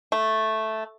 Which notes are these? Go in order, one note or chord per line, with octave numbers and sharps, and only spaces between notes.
A3